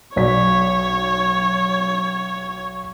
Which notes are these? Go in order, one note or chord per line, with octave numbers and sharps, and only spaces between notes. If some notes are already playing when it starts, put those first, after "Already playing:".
B1 C#5 D5 B6